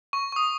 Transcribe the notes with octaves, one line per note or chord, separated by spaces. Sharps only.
C#6
C#6
D#6